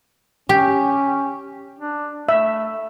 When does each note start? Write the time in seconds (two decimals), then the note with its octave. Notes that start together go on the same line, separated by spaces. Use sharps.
0.49 C#4 G4
1.79 D4
2.29 A3 E5